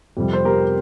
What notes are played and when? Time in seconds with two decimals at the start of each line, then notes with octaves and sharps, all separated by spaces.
0.17 F2 C3 G3
0.33 C5
0.45 G4 A#4